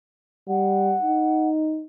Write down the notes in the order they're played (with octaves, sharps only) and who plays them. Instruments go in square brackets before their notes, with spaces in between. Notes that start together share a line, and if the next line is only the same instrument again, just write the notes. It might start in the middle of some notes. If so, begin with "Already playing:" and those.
[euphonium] G3 [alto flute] F#5
[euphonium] D#4